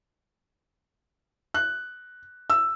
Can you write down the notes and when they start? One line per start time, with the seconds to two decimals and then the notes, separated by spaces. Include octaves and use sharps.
1.54 F#6
2.50 E6